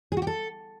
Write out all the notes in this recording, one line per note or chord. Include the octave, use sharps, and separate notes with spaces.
G#4
F#4
G4
A4